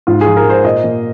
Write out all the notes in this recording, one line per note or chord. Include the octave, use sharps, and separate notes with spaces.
G#2 F4
G#4
F3
A#4
G#2 C5
A#2 D#5
A#3